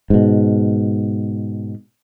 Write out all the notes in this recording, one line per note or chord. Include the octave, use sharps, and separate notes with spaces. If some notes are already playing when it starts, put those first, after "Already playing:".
G#2 B2